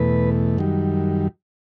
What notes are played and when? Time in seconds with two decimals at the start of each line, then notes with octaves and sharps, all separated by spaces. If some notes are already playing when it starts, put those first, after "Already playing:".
Already playing: E2 B2 A3 B4
0.58 F#2 D#3 G3